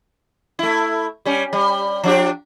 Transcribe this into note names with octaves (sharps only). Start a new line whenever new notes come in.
A3 E4
G3 C#4
G3
F3 D4 G4